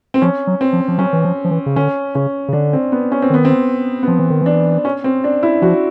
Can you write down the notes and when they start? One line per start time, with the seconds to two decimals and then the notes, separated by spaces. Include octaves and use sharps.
0.14 C4
0.22 F3 C#4
0.47 F#3
0.61 C4
0.73 F3
0.88 F3
0.98 F#3 C#4
1.13 E3
1.24 F3
1.44 F3
1.51 E3
1.66 C#3
1.76 D3 C#4
2.15 C#3 C#4
2.48 C#3
2.53 D3 D4
2.73 C4
2.92 B3
3.12 C#4
3.22 C4
3.30 D#3 B3
3.45 C4
4.03 B3
4.07 F3 C4
4.19 E3
4.30 D#3
4.42 E3 D4
4.85 C#4
5.04 C4
5.24 D4
5.43 E4
5.62 F3 F#4